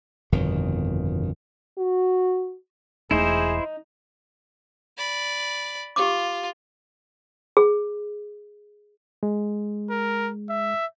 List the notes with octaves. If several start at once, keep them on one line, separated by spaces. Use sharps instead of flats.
G1 F2 B2 D#3
F#4
E1 A3 D#4 E4 G#4 C5
D5 B5
F4 G4 D6
G#4
G#3
A#4
E5